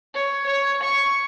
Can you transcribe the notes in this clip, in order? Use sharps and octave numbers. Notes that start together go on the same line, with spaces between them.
C#5
C#5
C#6